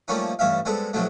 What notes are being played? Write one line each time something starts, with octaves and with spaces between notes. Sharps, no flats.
F3 G3 A3 A#3 C#4 D#4
A1 G2 C#4 E5 F5
G3 G#3 B3 C4 A4
B1 C3 F3 F#3 A3